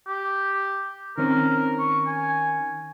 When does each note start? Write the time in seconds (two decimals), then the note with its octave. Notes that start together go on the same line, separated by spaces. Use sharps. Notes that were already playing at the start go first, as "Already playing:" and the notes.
0.07 G4
1.18 D#3 C4 C#4 A#4
1.79 C#6
2.07 G#5